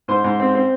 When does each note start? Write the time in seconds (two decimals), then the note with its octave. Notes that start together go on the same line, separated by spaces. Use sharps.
0.08 G#2 C5
0.24 G#2
0.40 C4
0.55 C4